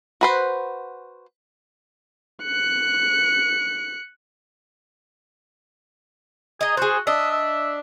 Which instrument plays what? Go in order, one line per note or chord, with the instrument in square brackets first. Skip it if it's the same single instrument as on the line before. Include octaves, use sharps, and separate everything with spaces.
[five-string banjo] F#4 B4 C5
[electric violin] F#6 C#7
[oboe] G#4 [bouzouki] D#5 A#5
[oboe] F#4 [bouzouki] G#4 C5
[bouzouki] D4 D#5 [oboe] E5
[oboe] E5